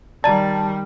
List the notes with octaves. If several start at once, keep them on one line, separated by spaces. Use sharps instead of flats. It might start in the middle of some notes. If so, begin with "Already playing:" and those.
D#3 G3 D5 A5 A#5